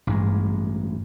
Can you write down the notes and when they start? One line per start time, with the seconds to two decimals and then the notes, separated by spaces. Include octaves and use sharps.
0.07 A1 G2 G#3